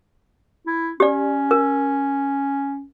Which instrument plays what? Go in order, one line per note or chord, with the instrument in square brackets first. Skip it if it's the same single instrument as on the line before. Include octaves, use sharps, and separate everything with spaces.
[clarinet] E4
[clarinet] C#4 [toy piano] G4 D5
[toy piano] A#4